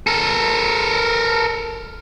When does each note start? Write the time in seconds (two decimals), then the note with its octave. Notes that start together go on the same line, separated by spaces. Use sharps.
0.07 A4 A#4